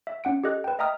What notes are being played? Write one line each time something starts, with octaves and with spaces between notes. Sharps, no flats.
E5
C#4 F#5 D7
G4 A4 D#5 F#6
B4 G5
D#5 E5 G5 A#5 D#6 F6